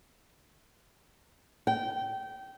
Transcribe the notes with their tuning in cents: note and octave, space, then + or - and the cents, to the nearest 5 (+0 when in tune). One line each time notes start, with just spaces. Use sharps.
G5 -20